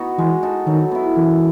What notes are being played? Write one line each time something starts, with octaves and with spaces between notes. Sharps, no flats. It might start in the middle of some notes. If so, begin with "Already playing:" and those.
Already playing: B3 D#4 F#4
E3 G#3
D#4 F#4 A4
D#3 F#3
B3 E4
F#2 E3